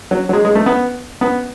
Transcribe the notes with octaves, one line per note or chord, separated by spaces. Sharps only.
F#3
F#3
G#3
G#3
A3
B3
B3